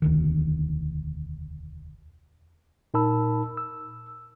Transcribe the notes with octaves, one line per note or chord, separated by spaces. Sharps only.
E1 D2 D#3
A#2 D#4 A#4 A5 B5 E6
E6